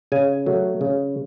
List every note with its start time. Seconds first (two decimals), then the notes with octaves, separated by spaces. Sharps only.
0.12 C#3 G#5
0.46 F#3 A3
0.81 C#3